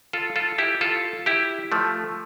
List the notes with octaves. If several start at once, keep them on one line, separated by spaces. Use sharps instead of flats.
F4 A4
F4 A4
E4 G4
F4 A4
E4 G4
F3 A3